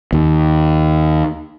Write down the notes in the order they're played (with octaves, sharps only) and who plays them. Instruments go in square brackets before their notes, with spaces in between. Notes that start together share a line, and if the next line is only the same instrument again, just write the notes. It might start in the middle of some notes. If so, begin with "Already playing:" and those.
[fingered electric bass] D#2